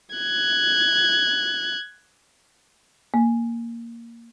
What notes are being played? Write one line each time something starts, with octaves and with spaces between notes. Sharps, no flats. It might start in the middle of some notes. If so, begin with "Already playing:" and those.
F#6 G#6
A#3